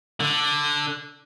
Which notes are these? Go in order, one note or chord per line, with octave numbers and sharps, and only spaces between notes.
D3